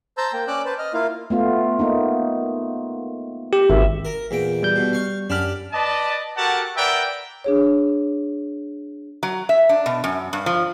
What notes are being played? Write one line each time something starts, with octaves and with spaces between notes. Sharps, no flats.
C5 A5 A#5 E6 G6
A#3 G5
C#4 D5 D6 E6 F#6
B4 C5 A5
D#5 F6
A#3 E4 F4 F5
A3 B3 F4
A#3 B3 D#4
G4
G#1 E5
A#4 A#5
E2 A#2 G5
G3 G6
B2
F5 C#6
F#2 D4 G4 B5 F6
B4 D5 D#5 A5
F#4 G4 A4 A#4 F#5 A5
A#4 B4 D5 E5 F#5 G5
D4 G#4 C#5
F#3
E5
D4
B2
F#2
G2
F3